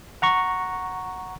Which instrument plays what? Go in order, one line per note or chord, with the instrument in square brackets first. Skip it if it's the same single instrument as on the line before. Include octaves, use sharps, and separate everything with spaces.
[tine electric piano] F#5 A#5 C#6